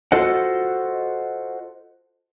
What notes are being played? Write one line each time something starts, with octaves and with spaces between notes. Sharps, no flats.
F4 F#4 A4 C5 D#5 F#5